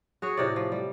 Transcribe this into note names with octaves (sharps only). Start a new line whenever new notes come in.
F#4 G#4 C#5
A2 C3 D5
F3
G3